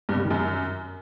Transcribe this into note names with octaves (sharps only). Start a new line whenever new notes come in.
G2
C3
G3
D#3
F#2